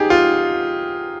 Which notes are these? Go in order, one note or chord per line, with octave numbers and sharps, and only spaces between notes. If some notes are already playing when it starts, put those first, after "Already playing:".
Already playing: D#4 G4 G#4
F4